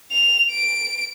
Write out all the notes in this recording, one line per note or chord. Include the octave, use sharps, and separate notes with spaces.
F7
D7